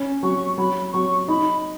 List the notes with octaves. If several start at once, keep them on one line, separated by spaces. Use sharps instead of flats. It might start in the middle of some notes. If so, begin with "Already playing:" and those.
Already playing: C#4
F#3 C#6
F#3 B5
F#3 C#6
D#4 B5